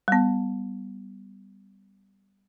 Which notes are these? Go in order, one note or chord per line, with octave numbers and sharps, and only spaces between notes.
G3 B3